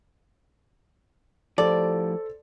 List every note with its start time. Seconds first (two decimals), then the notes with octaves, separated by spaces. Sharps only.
1.58 A2 F3 G4 A4 C5 D5